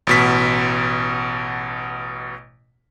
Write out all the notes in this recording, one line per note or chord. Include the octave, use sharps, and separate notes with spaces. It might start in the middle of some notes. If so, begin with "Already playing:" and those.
A1 B2 B6